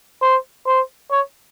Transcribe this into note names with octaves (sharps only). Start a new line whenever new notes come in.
C5
C5
C#5